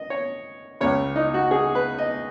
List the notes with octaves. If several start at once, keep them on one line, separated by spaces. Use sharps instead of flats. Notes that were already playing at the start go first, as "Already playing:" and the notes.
Already playing: D#5
C#5
C#2 C#3 C#5
D#4
F#4
G#4
B4
D#5